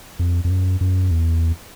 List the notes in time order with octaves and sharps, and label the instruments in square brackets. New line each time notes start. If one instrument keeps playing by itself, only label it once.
[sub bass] F2
F2
F#2
F#2
E2